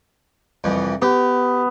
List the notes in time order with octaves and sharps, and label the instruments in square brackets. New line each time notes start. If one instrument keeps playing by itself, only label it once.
[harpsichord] C2 F2 E3
[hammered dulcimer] B3 [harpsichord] G4